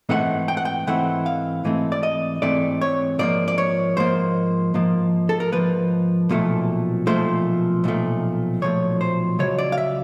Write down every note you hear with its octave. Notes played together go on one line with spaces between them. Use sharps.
G#2 E3 A3 C4 F#5
G5
F#5
G5
G#2 E3 A3 C4 F#5
F5
G#2 E3 A3 C4
D5
D#5
G#2 E3 A3 C4 D5
C#5
G#2 F3 A#3 D5
D5
C#5
G#2 F3 A#3 C5
G#2 F3 A#3
A4
A#4
G#2 F3 A#3 B4
B1 A#2 F3 A3
B1 A#2 F3 A3 C5
B1 A#2 F3 A3
B1 A#2 F3 A3 C#5
C5
C#2 C#3 F#3 C#5
D5
F5
E5